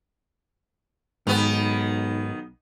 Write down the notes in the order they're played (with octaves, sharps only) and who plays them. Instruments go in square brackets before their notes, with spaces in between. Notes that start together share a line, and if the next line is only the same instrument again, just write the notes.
[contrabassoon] B1 [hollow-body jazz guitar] G#2 [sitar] D#3 B3